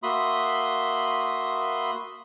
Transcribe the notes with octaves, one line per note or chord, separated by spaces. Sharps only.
A#3 F#4 E5 B5 C6 D#6